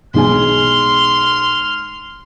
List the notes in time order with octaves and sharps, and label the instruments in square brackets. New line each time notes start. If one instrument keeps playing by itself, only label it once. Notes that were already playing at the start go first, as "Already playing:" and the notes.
[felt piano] B1 G#3 G#5 [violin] C6 [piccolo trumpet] F6